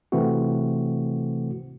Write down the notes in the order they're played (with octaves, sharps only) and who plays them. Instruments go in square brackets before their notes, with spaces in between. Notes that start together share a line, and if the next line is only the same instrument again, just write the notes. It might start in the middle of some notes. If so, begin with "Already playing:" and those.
[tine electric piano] C3 E3 A3 C4 F#4